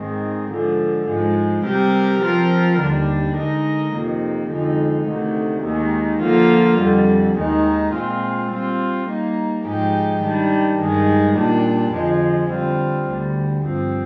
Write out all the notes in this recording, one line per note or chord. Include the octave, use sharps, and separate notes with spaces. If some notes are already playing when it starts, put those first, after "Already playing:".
Already playing: G#2 D#3 G#3 C4
D3 F3 G#3
G#2 F3 G#3
C3 G3 C4 G4 A#4
F3 C4 F4 A#4
D#2 D3 G3 D4
D3 G#3 D#4 A#4 D#5
F2 C3 D#3 A#3
F2 D3 G#3 D#4
D2 C3 D#3
D#2 D#3 G#3
D3 F3 A#3 F4
F2 D3 G3
D#2 D#3 G#3 D#4
A#2 G#3 C4 F4
G3 C4 F4
G3 A#3 D#4
G#2 F3 G#3 D#4 G4
D#3 G3 D4
G2 D#3 G#3
A#2 G3 D4
F2 D3 F3 G#3
D3 G3 C4 F4
D2 D3 G3
G2 F3 C4